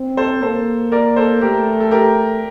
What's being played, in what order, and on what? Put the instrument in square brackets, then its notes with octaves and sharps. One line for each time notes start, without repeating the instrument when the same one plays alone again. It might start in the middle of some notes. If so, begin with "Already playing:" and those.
Already playing: [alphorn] C4
[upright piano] A4 C5
[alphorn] A#3 [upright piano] A4 C5
[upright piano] A#4 D5
A4 C5
[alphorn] A3 [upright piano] G4 A#4
[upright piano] A4
G4 A#4